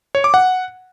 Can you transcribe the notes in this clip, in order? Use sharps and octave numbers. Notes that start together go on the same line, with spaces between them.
C#5
D6
F#5